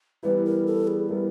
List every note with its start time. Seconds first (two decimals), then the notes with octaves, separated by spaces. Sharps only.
0.23 E3 G3 B3 E4 B4
0.45 A#4
0.67 A4
0.88 G#4
1.08 E3 G3 B3 E4 A#4